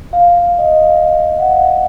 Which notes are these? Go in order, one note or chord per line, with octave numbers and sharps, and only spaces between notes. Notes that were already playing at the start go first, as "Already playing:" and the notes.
F5
D#5
F5
F5
F#5
F5